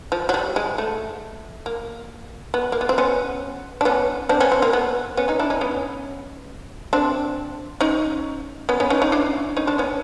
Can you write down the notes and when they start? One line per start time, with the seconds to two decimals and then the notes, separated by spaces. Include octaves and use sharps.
0.12 F3
0.29 F#3
0.34 G3
0.56 G#3
0.78 A3
1.66 A#3
2.54 B3
2.72 A#3
2.81 B3
2.89 C4
2.98 B3 C#4
3.81 D4
3.85 B3 C#4
4.29 C4 D4
4.40 B3 C#4
4.52 C4
4.62 A#3
4.73 B3
5.17 B3 C#4
5.28 C#4 D#4
5.39 D4 E4
5.50 C#4 D#4
5.61 B3 C#4
6.93 C4 D4
7.81 C#4 D#4
8.69 B3 C#4
8.80 B3 C#4
8.90 C#4 D#4
9.02 C#4 D#4
9.12 D4 E4
9.57 C#4 D#4
9.67 C4 D4
9.78 B3 C#4